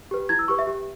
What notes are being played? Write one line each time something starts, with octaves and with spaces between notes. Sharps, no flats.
G4 B4
E4 G#6
E6
G4 B4 C#6
E5
G4